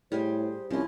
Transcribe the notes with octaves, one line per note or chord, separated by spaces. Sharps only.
A2 G3 G#4 C5
C2 F3 C#4 E4